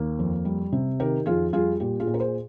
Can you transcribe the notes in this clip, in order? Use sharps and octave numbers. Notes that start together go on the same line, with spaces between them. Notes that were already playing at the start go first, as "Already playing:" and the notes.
Already playing: D#2 A#3
F2
G3
C3
D#3 G4 A#4
F2 F4 G#4
G3 F4 G#4
A#2 G4
F4 G#4
A#2
A#4
G#4 C5